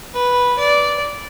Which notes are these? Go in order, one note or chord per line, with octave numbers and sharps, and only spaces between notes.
B4
D5